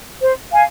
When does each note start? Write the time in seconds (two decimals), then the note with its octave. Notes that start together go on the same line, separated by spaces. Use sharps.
0.21 C5
0.52 F5 G#5